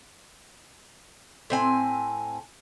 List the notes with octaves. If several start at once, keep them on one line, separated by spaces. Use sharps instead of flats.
A2 C4 G#5